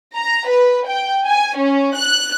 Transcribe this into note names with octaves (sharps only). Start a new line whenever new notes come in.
A#5
B4
G5
G#5
C#4
F#6